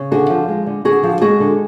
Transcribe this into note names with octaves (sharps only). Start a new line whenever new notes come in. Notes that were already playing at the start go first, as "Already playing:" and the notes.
Already playing: C#3
D3 F#4 G#4
F3
G#3
D3
D3 F#4 G#4
F3
G#3 F#4 G#4
D3